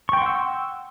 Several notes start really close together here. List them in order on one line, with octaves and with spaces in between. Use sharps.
C#6 G5 C6 F#5 E6